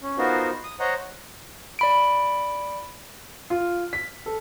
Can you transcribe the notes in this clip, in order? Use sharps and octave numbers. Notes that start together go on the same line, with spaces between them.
C#4
B3 D#4 F4 F#4 A#4 C5
D#6
C5 C#5 D#5 F#5 A#5
D5 B5 D7
F4
B6
A4